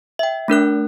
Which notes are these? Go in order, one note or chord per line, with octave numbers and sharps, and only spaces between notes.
E5 G5
A3 D4 A#4 F#6